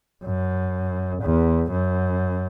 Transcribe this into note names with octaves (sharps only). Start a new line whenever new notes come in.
F#2
E2
F#2